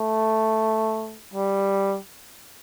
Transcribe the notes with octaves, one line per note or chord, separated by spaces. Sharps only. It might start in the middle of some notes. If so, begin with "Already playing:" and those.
Already playing: A3
G3